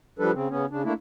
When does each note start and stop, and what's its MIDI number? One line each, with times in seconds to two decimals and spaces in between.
0.19 0.32 53
0.19 0.32 55
0.19 0.32 62
0.19 0.32 69
0.19 0.32 71
0.33 0.49 49
0.33 0.49 60
0.49 0.66 49
0.49 0.66 59
0.49 0.66 61
0.70 0.83 49
0.70 0.83 62
0.83 0.93 57
0.83 0.93 58
0.83 0.93 62
0.83 0.93 64